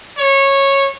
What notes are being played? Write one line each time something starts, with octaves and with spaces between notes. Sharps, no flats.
C#5